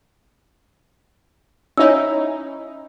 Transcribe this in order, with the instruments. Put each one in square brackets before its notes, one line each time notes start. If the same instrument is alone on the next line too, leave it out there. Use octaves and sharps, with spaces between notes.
[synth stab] C#4 D#4 E4 [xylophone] C#5 E6